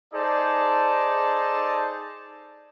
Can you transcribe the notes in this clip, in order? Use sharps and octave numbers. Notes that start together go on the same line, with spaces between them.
D#4 G#4 A4 C5 D5 A5